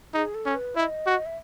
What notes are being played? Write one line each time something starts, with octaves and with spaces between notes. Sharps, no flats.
D#4 G#4
A4
C#4
B4
E4 D#5 E5
F#4
E5